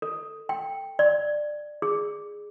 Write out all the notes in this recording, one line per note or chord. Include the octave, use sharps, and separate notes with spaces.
A4
G5
D5
G#4